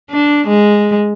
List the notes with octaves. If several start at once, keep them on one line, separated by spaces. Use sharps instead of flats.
D4
G#3